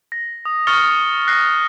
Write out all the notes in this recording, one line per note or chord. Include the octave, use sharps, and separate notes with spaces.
A#6
D#6
C#6 D#6 F6 A6 C#7 G7
F#6 A#6 C7